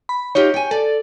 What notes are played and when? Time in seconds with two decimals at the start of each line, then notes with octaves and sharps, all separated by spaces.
0.09 B5
0.35 D#4 F4 G4 C#5
0.54 G5 G#5
0.71 A4 D5